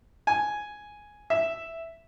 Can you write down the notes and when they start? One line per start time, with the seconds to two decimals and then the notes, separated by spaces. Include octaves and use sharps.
0.27 G#5
1.30 E5